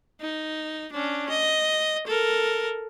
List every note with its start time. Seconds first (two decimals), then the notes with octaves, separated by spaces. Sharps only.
0.21 D#4
0.92 C#4 D4
1.30 D#5
2.07 A4 A#4